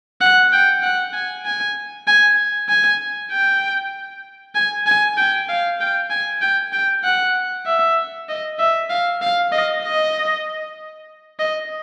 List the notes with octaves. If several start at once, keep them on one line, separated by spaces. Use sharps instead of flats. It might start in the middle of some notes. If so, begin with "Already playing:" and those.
F#5
G5
F#5
G#5
G#5
G#5
G#5
G5
G#5
G#5
G5
F5
G5
G#5
G5
G5
F#5
E5
D#5
E5
F5
F5
D#5
D#5
D#5